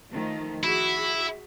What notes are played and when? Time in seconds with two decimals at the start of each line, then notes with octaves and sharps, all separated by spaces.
0.11 D#3 F3 A3
0.64 E4 F#4 G#4